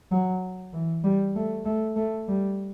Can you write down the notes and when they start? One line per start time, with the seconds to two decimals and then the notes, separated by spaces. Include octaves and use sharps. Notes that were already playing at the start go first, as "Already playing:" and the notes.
0.11 F#3
0.73 E3
1.04 G3
1.35 A3
1.65 A3
1.96 A3
2.27 G3